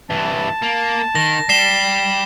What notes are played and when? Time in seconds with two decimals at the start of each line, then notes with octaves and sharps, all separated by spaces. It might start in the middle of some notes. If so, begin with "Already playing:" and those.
0.10 G2 E3 A5
0.62 A#3
1.15 D#3 A#6
1.49 G3 C7 E7 G7